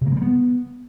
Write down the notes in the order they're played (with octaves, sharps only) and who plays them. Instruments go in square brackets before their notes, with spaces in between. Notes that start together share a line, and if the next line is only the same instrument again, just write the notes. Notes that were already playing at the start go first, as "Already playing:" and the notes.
[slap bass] C#3
A#3
G#3
G3
B3